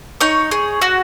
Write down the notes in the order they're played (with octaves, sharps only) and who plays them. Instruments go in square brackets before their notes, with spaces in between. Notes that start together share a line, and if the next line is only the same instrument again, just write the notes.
[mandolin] D#4 C#5
G#4
F#4